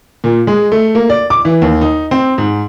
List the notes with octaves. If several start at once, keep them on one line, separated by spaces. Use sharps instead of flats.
A#2
G#3
A3
A#3
D5
D6
E3
D#2
D#4
C4
G#2